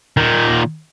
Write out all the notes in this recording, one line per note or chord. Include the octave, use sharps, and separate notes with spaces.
A#2 D#3